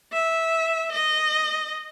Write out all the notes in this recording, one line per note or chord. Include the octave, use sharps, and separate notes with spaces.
E5
D#5